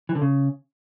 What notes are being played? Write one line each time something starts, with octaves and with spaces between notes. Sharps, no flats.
E3
D3
C#3